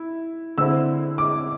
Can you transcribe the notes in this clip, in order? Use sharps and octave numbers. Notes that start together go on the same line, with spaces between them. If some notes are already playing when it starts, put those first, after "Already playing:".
Already playing: E4
D3 C4 E4 E6
D6